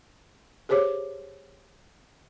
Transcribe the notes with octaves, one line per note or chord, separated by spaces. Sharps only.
G4 G#4 C5 C#5 D6